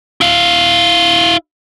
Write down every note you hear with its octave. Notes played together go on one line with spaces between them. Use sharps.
E4 F5